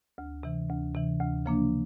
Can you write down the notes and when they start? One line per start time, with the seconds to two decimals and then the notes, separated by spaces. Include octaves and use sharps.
0.18 D2
0.43 C3 E3
0.69 D2
0.95 C3 E3
1.20 D2
1.46 C#3 F3 A#3 D4